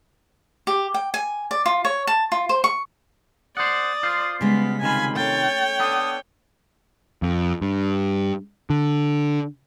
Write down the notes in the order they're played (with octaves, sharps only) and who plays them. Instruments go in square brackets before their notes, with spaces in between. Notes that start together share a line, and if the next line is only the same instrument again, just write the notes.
[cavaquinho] G4
G5
G#5
D5
F4
C#5
A5
F4
C5
C#6
[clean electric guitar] C5 F#5 [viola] D5 [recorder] D#6
[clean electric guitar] F4 C5
[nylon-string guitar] C#3 G3 G#3 [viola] B3 [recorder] B6
[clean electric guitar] C3 D#3 F4 [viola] G#5 B5
[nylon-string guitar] A3 C#4 [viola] C#5 G5 [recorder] A6
[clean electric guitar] B3 D4 A4 [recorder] D#6
[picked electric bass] F2
G2
D3